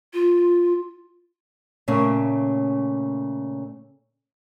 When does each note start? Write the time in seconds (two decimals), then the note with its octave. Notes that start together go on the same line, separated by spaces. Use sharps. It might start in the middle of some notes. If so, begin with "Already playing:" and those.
0.14 F4
1.88 A#2 C#3 A3 C#4